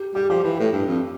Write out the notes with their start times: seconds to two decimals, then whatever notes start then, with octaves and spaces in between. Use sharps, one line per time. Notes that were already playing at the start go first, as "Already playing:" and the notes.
Already playing: G4
0.15 G3 G4
0.30 F3 G4
0.44 E3
0.59 A2
0.73 G2
0.87 F2